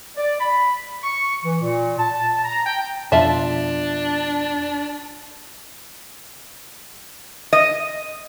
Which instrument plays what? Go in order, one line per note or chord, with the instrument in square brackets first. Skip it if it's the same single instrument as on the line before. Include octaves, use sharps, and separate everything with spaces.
[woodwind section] D5
B5
C#6
E3
A#2
A5
A#5
G5
[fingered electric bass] F2 B2 [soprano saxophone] D4 [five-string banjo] F4 E5 A5
[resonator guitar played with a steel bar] D#5